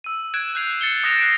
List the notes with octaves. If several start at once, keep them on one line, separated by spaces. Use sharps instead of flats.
E6 D#7
F#6 G#6 D7 E7
F#6 G6 C7 F7
A6 C#7 G7
D#6 F#6 A#6 C7 D7 E7
F#6 A#6 C7 D7